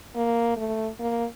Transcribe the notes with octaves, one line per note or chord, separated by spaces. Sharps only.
A#3
A3
A#3